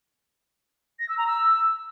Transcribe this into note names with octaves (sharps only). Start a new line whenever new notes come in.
A#6
E6
A#5
E6